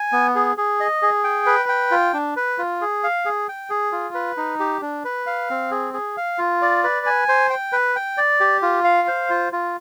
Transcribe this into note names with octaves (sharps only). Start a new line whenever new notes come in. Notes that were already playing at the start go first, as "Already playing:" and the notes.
Already playing: G#5
B3
G#4
G#4
D#5
G#4
G5
B4
G5
F4
D4
B4
F4
G#4
F5
G#4
G5
G#4
F4
B4
D#4
G4
D4
B4
F5
C4
G#4
G#4
F5
F4
D5
B4
G#5
C5
G5
B4
G5
D5
G4
F4
F5
C5
F4
F4